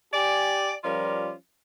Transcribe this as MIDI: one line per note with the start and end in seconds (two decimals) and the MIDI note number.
0.13 0.73 67
0.13 0.73 74
0.13 0.73 80
0.84 1.33 53
0.84 1.33 55
0.84 1.33 61
0.84 1.33 65
0.84 1.33 70
0.84 1.33 74